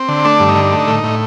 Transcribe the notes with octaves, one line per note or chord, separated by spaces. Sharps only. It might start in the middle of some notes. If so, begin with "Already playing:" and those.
Already playing: C4
D3
A3 D4
G2
D#4
D3
A3
A2
A2